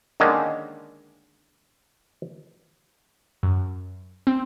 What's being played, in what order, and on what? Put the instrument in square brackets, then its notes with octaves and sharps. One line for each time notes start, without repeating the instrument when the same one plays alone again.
[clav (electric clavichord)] D3 D#3 G#3 A#3 C#4
[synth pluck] F#2
C4